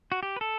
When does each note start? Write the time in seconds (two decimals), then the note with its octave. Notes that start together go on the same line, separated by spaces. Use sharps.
0.12 F#4
0.23 G4
0.36 B4
0.41 A4